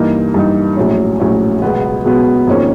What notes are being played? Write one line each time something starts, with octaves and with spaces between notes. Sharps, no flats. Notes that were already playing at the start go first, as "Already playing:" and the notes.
Already playing: G2 E3 G3 A#3 D#4
G2 E3 G3 A#3 D#4
A#1 A2 F#3 A3 C#4
A#1 A2 F#3 A3 C#4
C#2 B2 F#3 B3
C#2 B2 F#3 B3
G#1 G#2 F3 A#3 C#4